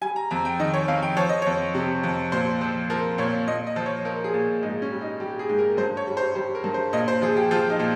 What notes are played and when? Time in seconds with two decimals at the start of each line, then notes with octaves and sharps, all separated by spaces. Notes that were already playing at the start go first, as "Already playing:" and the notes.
0.01 G3 G#5
0.16 A#5
0.31 F2 A#5
0.45 G5
0.59 D#3 D#5
0.74 C#5
0.88 F2 F5
1.03 G5
1.17 F3 C#5
1.29 D#5
1.42 F2 C#5
1.75 C3
2.03 F2
2.32 A#2 C5
2.61 F3
2.90 F3 A#4
3.18 A#2 C#5
3.48 A#2 D#5
3.67 D#5
3.76 F3
3.86 C#5
4.05 F3 A#4
4.24 G#4
4.34 A#2
4.63 G#2 D#4
4.82 C#4
4.91 G3
5.01 D#4
5.20 G3 G4
5.39 G#4
5.49 G#2
5.59 A#4
5.77 G2 C5
5.97 C#5
6.07 G3
6.17 C5
6.35 G3 C5
6.55 A#4
6.64 G2
6.74 C5
6.93 A#2 D#5
7.08 C5
7.22 F3 G#4
7.37 G4
7.51 F3 F4
7.70 D#4
7.80 A#2